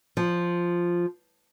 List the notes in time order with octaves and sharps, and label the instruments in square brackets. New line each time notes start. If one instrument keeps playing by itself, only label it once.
[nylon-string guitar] F3